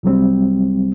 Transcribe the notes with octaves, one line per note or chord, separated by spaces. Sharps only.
C2 F#3 G3 C4